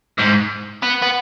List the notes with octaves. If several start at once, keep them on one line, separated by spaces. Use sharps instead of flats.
G#2
B3
B3